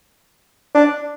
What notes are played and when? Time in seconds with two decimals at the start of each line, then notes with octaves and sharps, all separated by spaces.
0.74 D4